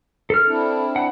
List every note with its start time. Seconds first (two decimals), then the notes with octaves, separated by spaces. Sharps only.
0.30 A4 F6
0.47 C4 D4 E4
0.96 F#5